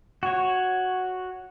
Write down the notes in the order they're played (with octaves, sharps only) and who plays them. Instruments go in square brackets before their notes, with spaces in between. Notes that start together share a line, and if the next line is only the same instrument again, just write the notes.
[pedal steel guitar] F#4 C#5